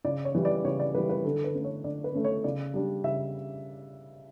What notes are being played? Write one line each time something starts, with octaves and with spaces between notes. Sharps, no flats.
C#3 D5
C#5
E3 G3
D5
C#3 C#5
D5
E3 G3 B4
B4
D3 A4
B4
A3 C#4
C#5
D3 D5
B4
A3 C#4
C#5
C#3 D5
G3 D4
C#3 E5